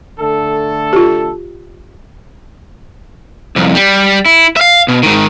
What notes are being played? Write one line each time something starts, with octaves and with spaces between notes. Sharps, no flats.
D3 A3 A4
F4 G4
C2 F2
G3
E4
E5 F5
B2
G#2 D#3